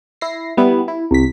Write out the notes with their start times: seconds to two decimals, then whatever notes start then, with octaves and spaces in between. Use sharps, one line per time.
0.21 E4 A#6 C7
0.57 G3 B3 E4
0.88 E4
1.11 C2 B6